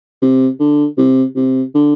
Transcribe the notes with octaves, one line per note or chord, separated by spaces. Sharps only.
C3
D3
C3
C3
D3